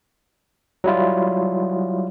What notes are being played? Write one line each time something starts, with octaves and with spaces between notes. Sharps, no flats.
F#3 G3 E4 F4